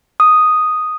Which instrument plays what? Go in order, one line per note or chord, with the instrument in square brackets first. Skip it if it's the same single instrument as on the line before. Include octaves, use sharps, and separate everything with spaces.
[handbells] D#6